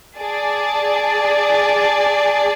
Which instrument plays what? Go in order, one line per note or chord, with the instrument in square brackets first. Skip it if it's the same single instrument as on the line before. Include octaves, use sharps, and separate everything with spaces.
[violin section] G#4 D5 A5